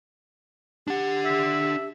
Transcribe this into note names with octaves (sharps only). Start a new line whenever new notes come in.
D4 G4 F#5
E5